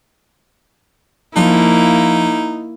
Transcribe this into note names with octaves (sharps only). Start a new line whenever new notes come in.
F3 A#3 D#4 E4